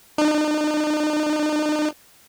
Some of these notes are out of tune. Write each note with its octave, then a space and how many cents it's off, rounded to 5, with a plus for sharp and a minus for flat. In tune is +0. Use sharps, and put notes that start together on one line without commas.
D#4 -45